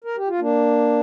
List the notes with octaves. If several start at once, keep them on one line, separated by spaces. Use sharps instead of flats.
A#4
G4
F4
A#3 D4